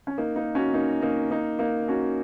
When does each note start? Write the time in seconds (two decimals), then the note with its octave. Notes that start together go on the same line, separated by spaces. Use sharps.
0.07 C#4
0.18 A#3 D#4
0.36 A#3 D#4
0.55 C#4 F#4
0.74 A#3 D#4
1.02 A#3 D#4
1.31 A#3 D#4
1.59 A#3 D#4
1.88 C#4 F#4